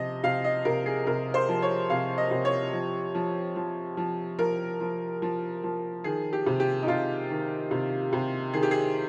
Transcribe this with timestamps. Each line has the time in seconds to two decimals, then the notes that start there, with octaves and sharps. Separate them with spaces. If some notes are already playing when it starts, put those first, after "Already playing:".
Already playing: C3 F3 D#5
0.23 C3 F5
0.44 D#5
0.65 C3 A#4
0.86 G#4
1.07 C3 A#4
1.34 C5
1.49 F3
1.62 C#5
1.90 C3 F5
2.18 D#5
2.31 C3
2.45 C#5
2.73 F3
3.14 F3
3.56 F3
3.97 F3
4.39 F3 A#4
4.80 F3
5.22 F3
5.64 F3
6.04 D#3 G#4
6.33 G4
6.46 C3
6.60 G4
6.82 D#4
6.87 C3 F4
7.30 D#3
7.71 C3
8.13 C3
8.53 D#3 G#4
8.63 G4
8.71 G#4